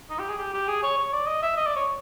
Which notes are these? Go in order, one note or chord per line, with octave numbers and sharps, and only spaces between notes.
D#4
G4
G#4
G4
G4
G#4
C#5
C#5
D5
D#5
E5
D#5
D5
C#5